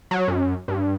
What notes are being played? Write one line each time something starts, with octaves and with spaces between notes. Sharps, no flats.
F#3
F#2
G2